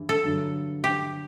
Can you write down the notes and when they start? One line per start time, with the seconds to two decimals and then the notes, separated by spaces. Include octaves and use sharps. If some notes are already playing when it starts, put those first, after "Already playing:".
Already playing: G2 E3
0.09 A4
0.23 G2 D3 F#3
0.84 G4